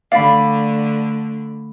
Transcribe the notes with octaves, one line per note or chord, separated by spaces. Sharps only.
D3 A3 D5 F5 B5